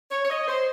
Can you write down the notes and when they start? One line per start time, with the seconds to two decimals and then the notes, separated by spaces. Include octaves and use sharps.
0.11 C#5
0.25 C#5
0.30 D#5
0.48 C5